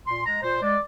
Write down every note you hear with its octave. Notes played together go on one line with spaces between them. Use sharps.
A#2 C6
G#3 A#5
A#2 C5
G#3 D5